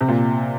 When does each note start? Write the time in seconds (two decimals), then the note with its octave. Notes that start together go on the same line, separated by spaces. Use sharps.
0.01 C3
0.08 A#2